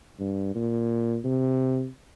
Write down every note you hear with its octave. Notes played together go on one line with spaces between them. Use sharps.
G2
A#2
C3